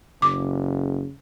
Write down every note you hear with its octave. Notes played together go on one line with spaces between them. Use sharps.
F#1 C#3 D6